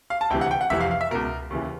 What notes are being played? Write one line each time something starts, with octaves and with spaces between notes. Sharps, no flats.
F5
A5
D2 C3 E3 G5
F#5
G5
F#5
F1 F2 C3 E3 E5
F5
F5
E5
C#2 B2 A#4
D#2 C#3 E3